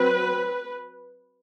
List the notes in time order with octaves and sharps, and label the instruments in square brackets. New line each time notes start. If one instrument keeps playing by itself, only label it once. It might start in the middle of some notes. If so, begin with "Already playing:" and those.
Already playing: [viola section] F#3 C4 B4